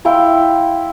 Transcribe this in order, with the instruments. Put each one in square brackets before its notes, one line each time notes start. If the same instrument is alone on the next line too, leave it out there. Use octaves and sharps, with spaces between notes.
[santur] E4 F5 G5 C6